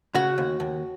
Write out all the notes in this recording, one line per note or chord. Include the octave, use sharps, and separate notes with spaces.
C#3 F#4
D#2
D#2